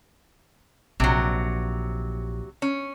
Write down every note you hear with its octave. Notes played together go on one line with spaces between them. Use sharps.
A#1 C3 F#3
C#4